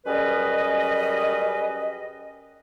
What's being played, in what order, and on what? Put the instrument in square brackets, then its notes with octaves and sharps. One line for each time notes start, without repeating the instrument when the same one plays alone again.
[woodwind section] F#2 G3 C#4 G#4 B4 D#5